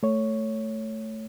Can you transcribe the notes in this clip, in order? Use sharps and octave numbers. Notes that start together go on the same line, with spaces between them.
A3 C#5